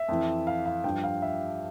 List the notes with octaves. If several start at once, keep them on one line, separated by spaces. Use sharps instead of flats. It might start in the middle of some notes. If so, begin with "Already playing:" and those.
Already playing: E5
F2 E3
F5
F5
G2 F3 G5
F5
E5